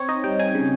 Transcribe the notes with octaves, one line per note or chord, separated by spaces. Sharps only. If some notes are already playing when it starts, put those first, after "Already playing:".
Already playing: C4 C#5
D#4 D#5
G3 G5
D#4 G#5
C#3